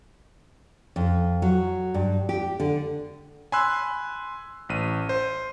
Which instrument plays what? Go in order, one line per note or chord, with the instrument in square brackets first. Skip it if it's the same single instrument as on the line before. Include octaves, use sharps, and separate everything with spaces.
[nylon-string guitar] F2
F#3
G2
G4
D3
[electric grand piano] G#5 B5 C6 E6 F#6
A1 D#7
C5